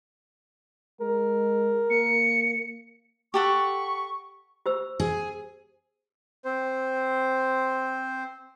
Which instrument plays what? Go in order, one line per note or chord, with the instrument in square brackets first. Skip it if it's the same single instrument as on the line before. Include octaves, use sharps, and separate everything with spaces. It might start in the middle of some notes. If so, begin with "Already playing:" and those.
[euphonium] G#3 [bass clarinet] A#4
[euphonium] A#3 [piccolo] C#7
[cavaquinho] G4 A4 F#5 [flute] C#6
[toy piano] G4 C5 E6
[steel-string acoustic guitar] G#4
[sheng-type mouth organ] C4 C5